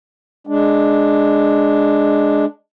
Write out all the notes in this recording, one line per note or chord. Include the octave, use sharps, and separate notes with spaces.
G#3 D4